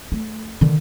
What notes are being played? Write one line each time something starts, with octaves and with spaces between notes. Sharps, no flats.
A3
D3 D#3